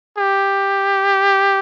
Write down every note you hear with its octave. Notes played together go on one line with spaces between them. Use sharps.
G4